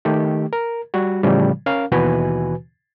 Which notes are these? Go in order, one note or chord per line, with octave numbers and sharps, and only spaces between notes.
D#3 A3 G4
A#4
G3 F#4
A2 C#3 E3 F3 G3
C#4 A#4 F5
D#2 B2 E3 F#4 B4 G#5